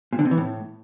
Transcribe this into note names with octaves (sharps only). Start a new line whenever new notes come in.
A#2
D3
C3
E3
A2